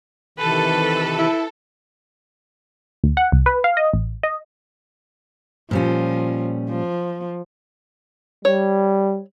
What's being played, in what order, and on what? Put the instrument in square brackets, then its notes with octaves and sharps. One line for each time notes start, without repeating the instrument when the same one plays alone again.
[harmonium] C3 D#3 E3 [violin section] A4 [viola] B4
[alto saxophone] E4
[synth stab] D2
F#5
C2
B4
F5
D#5
A1
D#5
[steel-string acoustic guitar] A#2 G3 C#4 [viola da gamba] F3
[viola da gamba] F3
[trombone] G3 [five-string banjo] C#5